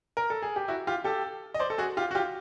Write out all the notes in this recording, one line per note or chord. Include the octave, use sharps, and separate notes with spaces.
A#4
A4
G#4
G4
E4 F#4
F4 G4
G4 A4
D#5
C5 D5
A4
F#4 G#4
F4 G4
F#4
F4 G4